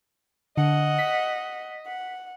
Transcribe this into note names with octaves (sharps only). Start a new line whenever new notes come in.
D3 D#5 F#5
B6
F#5